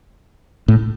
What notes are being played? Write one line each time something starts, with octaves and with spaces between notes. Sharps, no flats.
A2